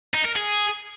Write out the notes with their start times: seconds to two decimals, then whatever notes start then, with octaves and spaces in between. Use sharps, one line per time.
0.14 D#4
0.25 A#4
0.36 G#4